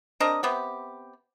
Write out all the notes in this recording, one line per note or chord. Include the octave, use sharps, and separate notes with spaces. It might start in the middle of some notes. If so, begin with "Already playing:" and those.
C4 D4 A#4 D#5
C3 B3 G4